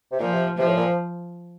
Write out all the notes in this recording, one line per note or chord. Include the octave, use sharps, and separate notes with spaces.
C3
A#2 F3
C3
C3 F3
A2
A#2
F3